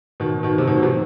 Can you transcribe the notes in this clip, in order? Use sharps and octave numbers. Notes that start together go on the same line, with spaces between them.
B2 D#3
B2 D#3
C3
B2 D#3
F#3
C3 E3